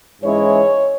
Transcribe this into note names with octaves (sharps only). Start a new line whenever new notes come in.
G#2 E3 G#3 C#4 E4 C#5